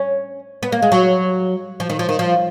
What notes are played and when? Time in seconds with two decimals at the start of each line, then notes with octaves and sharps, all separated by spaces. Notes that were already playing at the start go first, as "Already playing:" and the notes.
Already playing: C#4
0.63 B3
0.72 A#3
0.82 G#3
0.92 F#3
1.80 F3
1.90 D#3
1.99 F3
2.09 D#3
2.19 F3